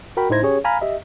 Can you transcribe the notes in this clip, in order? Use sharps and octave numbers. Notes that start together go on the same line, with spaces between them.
F#4 A#4 G5 B5
A2 D#4 E4 C5 G#6 A#6
C#4 G4 G#4 C#5
F5 G#5 A#5 B5 F6
G4 D#5 E5